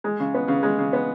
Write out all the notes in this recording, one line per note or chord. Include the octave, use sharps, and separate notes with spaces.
G#3
C#3
B3
C#3
G#3
C#3
B3